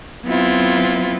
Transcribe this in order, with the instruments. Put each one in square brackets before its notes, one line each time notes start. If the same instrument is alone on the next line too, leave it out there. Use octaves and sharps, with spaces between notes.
[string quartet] F#3 B3 C4 E4 F4